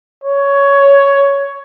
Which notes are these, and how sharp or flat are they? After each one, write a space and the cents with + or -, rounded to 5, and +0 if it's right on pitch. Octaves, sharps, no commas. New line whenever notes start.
C#5 +10